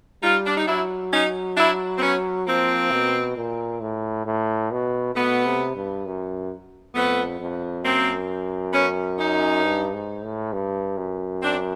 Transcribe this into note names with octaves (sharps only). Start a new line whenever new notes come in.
G3 D#4 F4
D4
D#4
F#3 D4 E4
C#4 D#4
D4 E4
C4
B3 C#4
F3 A#3 C4
B2
A#2
A2
A2
B2
B2 A3 B3
C3
G2
F#2
F2 A3 B3
F2
F#2 A#3 C4
B3 C#4
C#4 D#4
G2
G#2
A2
G2
F#2
C4 D4